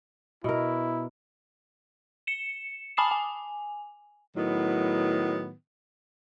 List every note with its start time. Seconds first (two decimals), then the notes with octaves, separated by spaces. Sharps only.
0.44 B2 E4 A#4
2.27 C#7 E7
2.97 G#5 A5 B5 D#6 C7 E7
3.11 G#5
4.35 A2 D#3 F#3 B3